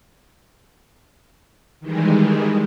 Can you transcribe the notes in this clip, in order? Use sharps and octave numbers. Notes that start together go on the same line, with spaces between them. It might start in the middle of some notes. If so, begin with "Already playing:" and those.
D#3 E3 G3 G#3